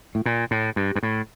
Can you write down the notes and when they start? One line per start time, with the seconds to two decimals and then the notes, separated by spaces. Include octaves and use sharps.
0.15 A2
0.26 A#2
0.51 A2
0.76 G2
0.96 G2
1.03 A2